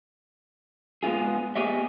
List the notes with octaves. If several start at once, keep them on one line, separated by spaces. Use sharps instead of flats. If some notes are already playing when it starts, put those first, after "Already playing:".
G#3 B3 D#4 F4 G#4
B3 G4 G#4 C#5 D#5 E5